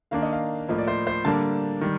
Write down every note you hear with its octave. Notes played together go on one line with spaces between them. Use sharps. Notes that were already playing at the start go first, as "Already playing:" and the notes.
D#3 A#3 D4 F5
D#5
F5
A2 F3 A#3 D#5
D5
C5
C5
D3 G3 A#3 D4 A5
D#3 G3